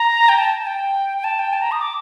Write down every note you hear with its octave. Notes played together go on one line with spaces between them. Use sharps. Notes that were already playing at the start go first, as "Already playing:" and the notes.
Already playing: A#5
G5
A5
A5
G5
G5
A5
G5
A5
A#5
D#6
D6